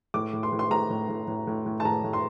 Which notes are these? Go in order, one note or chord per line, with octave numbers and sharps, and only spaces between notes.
A2 D6
A2
C6
A2
C6
A2 A#5
A2
A2
A2
A2
A2
A5
A2 A#5
A2
C6